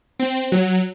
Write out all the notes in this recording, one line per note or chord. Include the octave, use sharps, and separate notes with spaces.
C4
F#3